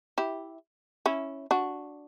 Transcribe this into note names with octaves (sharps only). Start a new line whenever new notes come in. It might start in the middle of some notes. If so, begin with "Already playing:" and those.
E4 G4
C#4 E4
D4 F#4